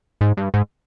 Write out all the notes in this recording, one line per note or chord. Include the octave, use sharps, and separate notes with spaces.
G#2
G2
G#2